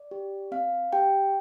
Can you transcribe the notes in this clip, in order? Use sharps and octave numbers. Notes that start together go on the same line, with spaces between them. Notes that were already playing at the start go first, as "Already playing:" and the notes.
Already playing: D5
G4
C4 F5
G4 G5